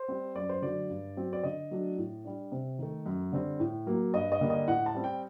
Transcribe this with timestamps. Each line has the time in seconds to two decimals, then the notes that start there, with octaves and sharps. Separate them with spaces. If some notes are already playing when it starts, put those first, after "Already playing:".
Already playing: C5
0.08 G3 C4
0.35 F#2 D5
0.49 C5
0.62 D3 F#3 A3 D5
0.89 G2
1.17 F#3 C4
1.33 D5
1.44 D3 D#5
1.71 F#3 A3 D4
1.98 A2
2.25 G3 D4
2.52 C3
2.79 D#3 A3
3.06 F#2
3.32 D3 G3 C4
3.60 A2
3.87 F#3 A#3
4.14 G2 D#5
4.32 D#5
4.40 D3 G3 A#3 D4
4.50 D#5
4.67 A2 F#5
4.86 A5
4.94 G3 C4
5.04 G5